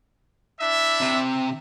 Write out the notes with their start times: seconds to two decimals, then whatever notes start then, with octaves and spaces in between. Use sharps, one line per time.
0.59 D4 E4 E5
1.01 C3